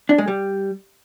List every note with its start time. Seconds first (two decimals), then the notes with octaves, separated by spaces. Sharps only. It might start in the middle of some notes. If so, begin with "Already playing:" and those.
0.09 D4
0.18 G#3
0.28 G3